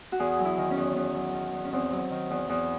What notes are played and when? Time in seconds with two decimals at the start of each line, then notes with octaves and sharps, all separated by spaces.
0.12 F#4
0.19 E2 G#4
0.39 F#3
0.45 E4
0.58 D#3
0.71 C#4
0.77 E2
0.96 E2 C#4
1.15 F#3
1.34 D#3
1.53 E2
1.65 C#4
1.73 E2 C4
1.92 F#3
2.10 D#3
2.31 E2
2.49 E2